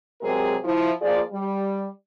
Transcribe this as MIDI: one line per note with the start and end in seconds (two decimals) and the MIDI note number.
0.21 0.56 48
0.21 0.56 54
0.21 0.56 56
0.21 0.56 60
0.21 0.56 68
0.21 0.56 70
0.64 0.92 53
0.64 0.92 64
1.02 1.21 53
1.02 1.21 58
1.02 1.21 65
1.02 1.21 68
1.02 1.21 74
1.32 1.87 55